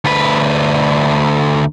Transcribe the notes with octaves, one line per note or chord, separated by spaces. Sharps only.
D2 B4